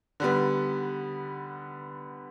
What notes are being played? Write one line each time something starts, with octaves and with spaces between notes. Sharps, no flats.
D3 G3 B3